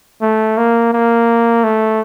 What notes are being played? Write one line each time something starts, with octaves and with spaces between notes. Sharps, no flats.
A3
A#3
A#3
A3